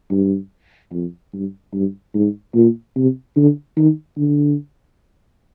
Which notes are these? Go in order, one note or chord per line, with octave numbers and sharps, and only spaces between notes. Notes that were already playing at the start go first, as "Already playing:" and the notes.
G2
F2
G2
G2
G#2
A#2
C3
D3
D#3
D3